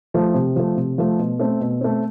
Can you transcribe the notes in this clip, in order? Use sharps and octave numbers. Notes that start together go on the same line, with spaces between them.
F3 A3
C3
F3 A3
C3
F3 A3
B2
A3 C4
B2
A3 C4